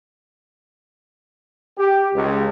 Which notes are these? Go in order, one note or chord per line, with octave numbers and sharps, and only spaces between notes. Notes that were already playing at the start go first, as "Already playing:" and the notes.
G4
C#2